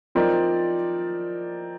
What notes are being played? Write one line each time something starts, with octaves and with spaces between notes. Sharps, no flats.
F3 C4 D#4 A#4 D5